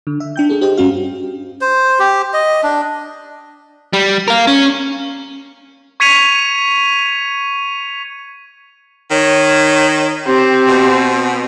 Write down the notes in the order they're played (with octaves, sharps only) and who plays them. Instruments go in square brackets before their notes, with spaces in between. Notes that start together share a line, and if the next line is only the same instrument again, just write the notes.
[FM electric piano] D3
E5
D4 G5 G6
D4 G#4 A4
G4 C5 D#5 G5
G2 C#4 F#4 F5
[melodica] C5
G4
D#5
D4
[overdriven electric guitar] G3
A#4 F5
C#4
[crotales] C#6 G#6 B6 C#7 D#7 F7
[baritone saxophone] D#3 [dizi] C#5
[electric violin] C4 C5 [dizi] G4
[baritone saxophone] B2